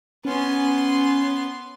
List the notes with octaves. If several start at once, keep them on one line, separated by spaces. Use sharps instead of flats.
B3 C#4 C6